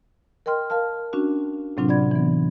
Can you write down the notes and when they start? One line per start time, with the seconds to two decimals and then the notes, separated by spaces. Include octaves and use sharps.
0.46 A#4 D#5 G5 C6 F6
0.70 A#4 F5 A5 F6
1.13 C#4 D4 F#4
1.77 A2 C3 F#3 C4 D4 F4
1.89 F4 D5 F#5 B5 G#6
2.11 E3 B3